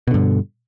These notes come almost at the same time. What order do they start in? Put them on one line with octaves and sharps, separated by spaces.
B2 D3 G2